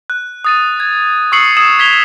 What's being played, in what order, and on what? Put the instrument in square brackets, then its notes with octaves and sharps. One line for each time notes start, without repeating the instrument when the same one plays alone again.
[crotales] F#6
D#6 A6 D#7
G#6
C#6 D#6 E6 C7 C#7 F#7
D#6 G#6 E7 F#7
G#6 B6 F7 G7